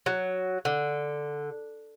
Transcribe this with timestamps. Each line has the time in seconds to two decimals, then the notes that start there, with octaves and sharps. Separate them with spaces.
0.06 F#3
0.65 D3